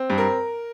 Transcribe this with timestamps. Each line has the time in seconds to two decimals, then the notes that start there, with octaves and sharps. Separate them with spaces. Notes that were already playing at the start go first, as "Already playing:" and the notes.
Already playing: C4
0.10 G2
0.18 A#4